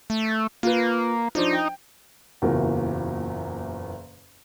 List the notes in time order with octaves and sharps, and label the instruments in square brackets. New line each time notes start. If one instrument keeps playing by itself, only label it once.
[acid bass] A3
[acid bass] A#3 [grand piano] F4 B4
[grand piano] F3 D4 C5 [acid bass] D#4
[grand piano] G5
[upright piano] F#1 E2 A#2 F#4 A#4